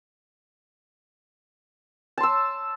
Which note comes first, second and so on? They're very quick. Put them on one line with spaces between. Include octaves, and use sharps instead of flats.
A5 C6 E6